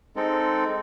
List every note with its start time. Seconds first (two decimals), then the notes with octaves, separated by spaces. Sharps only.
0.16 G#3 C4 D#4 A4